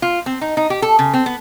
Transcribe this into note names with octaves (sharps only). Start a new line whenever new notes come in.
F4
C4
D#4
D#4
G4
A4
C#3
C4
B3